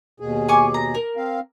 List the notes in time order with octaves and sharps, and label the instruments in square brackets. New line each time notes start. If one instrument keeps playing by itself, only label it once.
[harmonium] D#2 B2 G#4
[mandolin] G#5 C#6 D6
A#5
A#4
[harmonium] C4 F5